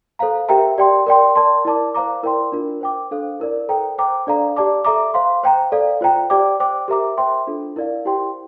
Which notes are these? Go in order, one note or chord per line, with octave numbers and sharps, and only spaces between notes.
A4 C5 F5 A#5
G4 A#4 E5 G5 A#5
G4 D5 G5 C6
A#4 D5 G5 C6
A#4 D5 A5 C6
E4 A#4 D5 A5 D6
C5 F5 A#5 D6
E4 A#4 D5 G5 C6
D4 F4 A#4
C5 G5 D6
D4 A4 C5 F5
E4 A#4 D5
A4 C5 G5 A#5
C5 G5 A#5 D6
D4 A4 D5 F5 A#5
G4 D5 A5 D6
A4 E5 A#5 D6
C5 F5 C6
C5 G5 A#5
A4 D5 F5
F4 C5 G5 A#5
G4 D5 G5 D6
C5 G5 D6
G4 A#4 E5 A#5 D6
C5 E5 G5 C6
D4 F4 A4
E4 A#4 D5 F5
E4 G4 C5 G5 C6